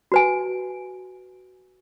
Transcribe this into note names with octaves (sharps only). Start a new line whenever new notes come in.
F#4 B4 G#5